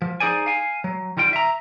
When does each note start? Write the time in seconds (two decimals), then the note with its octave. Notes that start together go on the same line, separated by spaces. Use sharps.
0.02 F3
0.20 D#4 G#4 C5 D5 G#5
0.46 F5 G#5
0.84 F#3
1.17 D#3 G3 F4 G5
1.33 E5 A#5